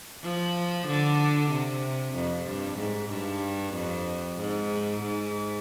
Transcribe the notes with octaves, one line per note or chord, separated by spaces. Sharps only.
F3
D3
C3
F2
G2
G#2
G2
F2
G#2
G#2